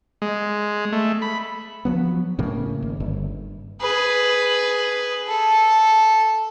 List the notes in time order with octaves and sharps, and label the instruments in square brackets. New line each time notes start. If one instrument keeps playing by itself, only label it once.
[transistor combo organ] G#3
A3
B5
[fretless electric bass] F3 F#3 B3
A2 C#3 A#3
G#1
G1
[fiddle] G#4 B4
A4